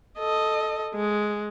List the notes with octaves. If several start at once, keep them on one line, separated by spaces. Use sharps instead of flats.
A4 D#5
G#3